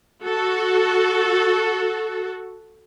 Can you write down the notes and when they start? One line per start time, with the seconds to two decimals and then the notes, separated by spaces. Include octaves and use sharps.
0.23 F#4 A4